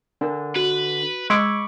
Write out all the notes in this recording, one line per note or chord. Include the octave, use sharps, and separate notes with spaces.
D3 D4 A#4
F#4 B4
G#3 B5 C#6 D6 E6 G#6 D7